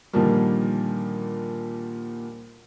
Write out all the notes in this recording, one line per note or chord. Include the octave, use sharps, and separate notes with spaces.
A#2 D3 D#3 F3 G3 A#3